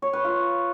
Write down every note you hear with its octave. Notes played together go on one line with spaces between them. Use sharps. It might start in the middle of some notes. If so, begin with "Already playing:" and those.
C#5
B4
F4